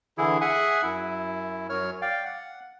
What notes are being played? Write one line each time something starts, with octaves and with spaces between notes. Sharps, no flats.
D3 E3 E4 G#4
G#4 E5 F#5 G#5 F#6
F#2 E4
F#2 C#5 F6
D5 F5 G5
F#5